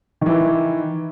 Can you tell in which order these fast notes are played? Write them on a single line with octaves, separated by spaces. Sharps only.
D#3 E3 E4